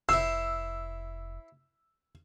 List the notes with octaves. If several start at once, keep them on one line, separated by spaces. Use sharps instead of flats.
F1 E4 C5 E6